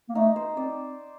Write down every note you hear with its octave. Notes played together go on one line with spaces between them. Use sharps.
A#3
A3 D#4
C5
C4 D5